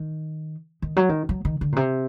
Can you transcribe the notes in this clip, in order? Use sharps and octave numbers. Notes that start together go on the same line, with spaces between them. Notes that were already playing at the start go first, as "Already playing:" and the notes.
Already playing: D#3
D#3
F#3
D#3
F#3
D#3
D3
A#2
C3